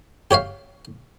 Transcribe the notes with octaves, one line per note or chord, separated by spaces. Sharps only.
G4 C#5 E5 F5